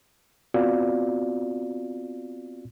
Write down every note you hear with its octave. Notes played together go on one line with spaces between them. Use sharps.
B3 C4 F4 F#4 D5 F5